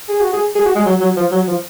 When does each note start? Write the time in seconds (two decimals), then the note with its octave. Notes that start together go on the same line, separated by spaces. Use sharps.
0.09 G#4
0.21 F#4
0.33 G#4
0.55 G#4
0.65 F#4
0.75 G#3
0.86 F#3
1.01 F#3
1.16 F3
1.32 F#3
1.47 F3